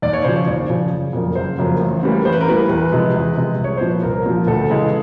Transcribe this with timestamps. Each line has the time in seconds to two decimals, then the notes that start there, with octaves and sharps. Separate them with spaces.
0.02 D#2 D5
0.13 C#5
0.24 C#3 F3 C5
0.36 C#5
0.47 D#2 D5
0.70 C#3 F3
0.92 F#1
1.13 F2 C#3 F#3 A#3
1.35 F#1 C5
1.59 F2 C#3 F#3 A#3
1.80 A1
2.03 A2 E3 G3 A#3
2.25 A1 C5
2.33 B4
2.41 A#4
2.48 A2 E3 G3 A#3 B4
2.69 E2 B4
2.92 C3 F3 G#3
3.14 E2
3.36 C3 F3 G#3
3.58 C2
3.64 C#5
3.77 A#2 F3 C5
3.89 B4
4.03 C2 A#4
4.25 A#2 F3
4.47 D2 A4
4.70 C#3 E3 G#3